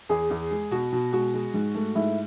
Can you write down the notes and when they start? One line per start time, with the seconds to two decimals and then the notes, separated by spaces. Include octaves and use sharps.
0.09 E2 G#4
0.30 E2
0.51 G#3
0.71 B2 F#4
0.92 B2
1.12 G#3 F#4
1.34 G#3
1.54 G#2
1.75 A3
1.95 G#2 E4